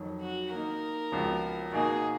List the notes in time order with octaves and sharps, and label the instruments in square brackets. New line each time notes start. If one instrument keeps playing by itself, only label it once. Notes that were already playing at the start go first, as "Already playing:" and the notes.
Already playing: [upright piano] F2 D#3 F#3
[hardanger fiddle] F#4
[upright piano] D#3 A#3 D#4 [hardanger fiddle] A#4
[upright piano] C#2 C#3 F3 B3 F#4
[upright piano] B2 A#3 D#4 F#4 [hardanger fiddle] G#4